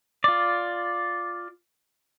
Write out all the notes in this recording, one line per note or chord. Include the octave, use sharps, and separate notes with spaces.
F4 D5